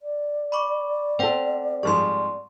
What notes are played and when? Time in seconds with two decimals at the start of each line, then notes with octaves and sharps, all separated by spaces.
0.01 D5
0.52 B5 C#6 D6
1.19 C4 A4 C5 F#5 G5
1.83 G#2 F3 G3 C6 C#6